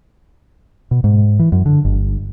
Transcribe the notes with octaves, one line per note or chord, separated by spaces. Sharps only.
B2
G#2
E3
F#2
D3
G1